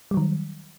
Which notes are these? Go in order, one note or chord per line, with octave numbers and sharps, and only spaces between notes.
D#3 F#3 G3